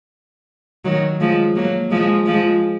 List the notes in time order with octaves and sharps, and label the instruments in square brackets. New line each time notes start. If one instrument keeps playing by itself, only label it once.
[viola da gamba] D#3 F#3
F3 G#3
F#3 A#3
F3 G#3
F3 G#3